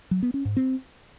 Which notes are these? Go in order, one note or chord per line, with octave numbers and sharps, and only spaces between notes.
F#3
B3
C#4
G#2
C4